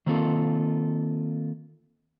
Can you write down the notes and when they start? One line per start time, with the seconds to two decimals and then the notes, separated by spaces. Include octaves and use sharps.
0.06 D#3 A#3 C4 F4 A4